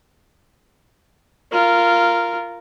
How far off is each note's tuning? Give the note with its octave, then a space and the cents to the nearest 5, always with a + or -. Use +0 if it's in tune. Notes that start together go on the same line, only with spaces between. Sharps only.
F4 -10 A#4 -5